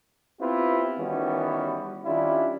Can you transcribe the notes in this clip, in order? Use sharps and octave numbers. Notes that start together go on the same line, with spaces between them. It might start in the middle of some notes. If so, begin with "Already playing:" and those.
B3 C4 E4 F4 G4 B4
D#3 E3 G3 B3 C#4 F#4
D#3 G3 C#4 D4 E4 F4